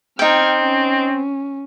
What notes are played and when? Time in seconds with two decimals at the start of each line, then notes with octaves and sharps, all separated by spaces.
0.19 C4 D#4 G5 F6 G#6
0.62 C#4